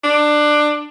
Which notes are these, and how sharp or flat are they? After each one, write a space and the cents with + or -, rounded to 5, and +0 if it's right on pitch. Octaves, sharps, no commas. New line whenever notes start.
D4 +20